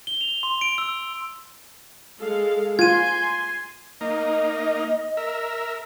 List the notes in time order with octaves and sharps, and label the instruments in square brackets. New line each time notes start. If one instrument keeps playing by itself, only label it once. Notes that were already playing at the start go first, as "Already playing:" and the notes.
[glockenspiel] G7
F7
C6
D7
E6
[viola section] G#3 A4 F5
[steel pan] F4 [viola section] G#5 C6 [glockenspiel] G#6 D#7
[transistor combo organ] A#3 D#4 [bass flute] D#5
[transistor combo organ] A#4 E5